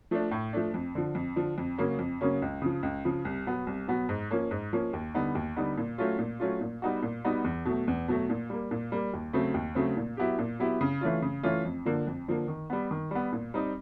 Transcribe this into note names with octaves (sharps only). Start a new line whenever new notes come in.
F3 A3 D4
A2
F3 A3 D4
F2
D3 F3
F2
D3 F3
F2
C#3 F#3 A#3 C#4
F2
C#3 F#3 A#3 C#4
C#2
C#3 F3
C#2
C#3 F3
C2
B2 F#3 B3
C2
B2 F#3 B3
G#2
F3 A#3 C#4
G#2
F3 A#3 C#4
D#2
D3 G3 B3 D#4
D#2
D3 G3 B3 D#4
A#2
F#3 A3 C#4 F4
A#2
F#3 A3 C#4 F4
A#2
G3 B3 D#4 F#4
A#2
G3 B3 D#4 F#4
E2
B2 F#3 A3
E2
B2 F#3 A3
A#2
G3 A#3
A#2
G3 A#3
D#2
C#3 F#3 A3 C4
D#2
C#3 F#3 A3 C4
A#2
F#3 B3 E4 G4
A#2
F#3 B3 E4 G4
C#3
E3 A3 C#4 F4
C#3
E3 A3 C#4 F4
F2
D3 F3 A#3
F2
D3 F3 A#3
D#3
G3 B3
D#3
G3 B3
A#2
G3 C4 D#4